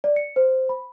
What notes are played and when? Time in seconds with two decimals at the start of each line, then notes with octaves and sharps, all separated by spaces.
0.04 D5
0.16 C#7
0.36 C5
0.69 B5